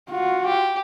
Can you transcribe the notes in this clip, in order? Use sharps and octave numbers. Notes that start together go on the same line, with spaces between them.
F4 F#4
G4